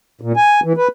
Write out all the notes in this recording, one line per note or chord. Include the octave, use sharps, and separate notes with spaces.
A#2
G#5
E3
B4